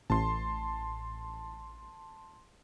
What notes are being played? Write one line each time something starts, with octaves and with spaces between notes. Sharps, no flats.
A1 A5 C6